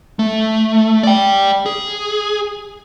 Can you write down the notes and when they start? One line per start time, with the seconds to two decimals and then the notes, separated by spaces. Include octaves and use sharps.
0.19 A3
1.03 D5 G5
1.66 G#4